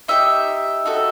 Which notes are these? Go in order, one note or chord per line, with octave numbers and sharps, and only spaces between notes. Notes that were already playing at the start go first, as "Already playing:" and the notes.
D#4 G4 E5
D#4 F#4 A4